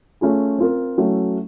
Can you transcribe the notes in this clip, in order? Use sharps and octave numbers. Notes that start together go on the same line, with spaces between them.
A3 C#4 F4 G#4
C4 F4 A#4
F#3 A3 C#4 E4